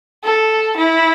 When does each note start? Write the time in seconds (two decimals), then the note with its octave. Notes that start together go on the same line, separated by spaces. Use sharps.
0.24 A4
0.77 E4